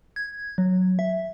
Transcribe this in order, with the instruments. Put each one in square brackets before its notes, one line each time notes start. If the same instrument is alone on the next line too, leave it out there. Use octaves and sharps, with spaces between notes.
[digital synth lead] G#6
F#3
E5